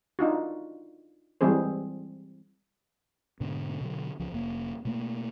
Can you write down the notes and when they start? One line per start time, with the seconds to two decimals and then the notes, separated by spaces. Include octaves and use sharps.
0.19 D4 D#4 F4 F#4
1.41 E3 G3 G#3 C4 G#4 C5
3.40 G#2 B2 D3
3.81 B2 D3 F#3
4.19 C#2 F3
4.32 F1 A#3
4.85 B2 A3 A#3